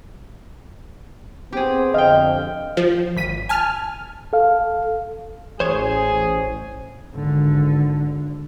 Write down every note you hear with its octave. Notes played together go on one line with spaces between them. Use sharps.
B3 C4 G4 G#4
F2 D3 D#5 F5 G5
F3
G#1 B6 D#7
G#5 A5 F6
A4 F5
A1 G#4 C5 C#5
G#1 D3